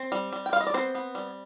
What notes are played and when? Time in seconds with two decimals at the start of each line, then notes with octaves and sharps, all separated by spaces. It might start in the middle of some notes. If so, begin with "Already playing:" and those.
Already playing: C4 C5
0.12 G3
0.33 G3
0.46 G5
0.53 G3 F5
0.60 D#5
0.67 D5
0.74 B3 C4 C5
0.95 B3
1.15 G3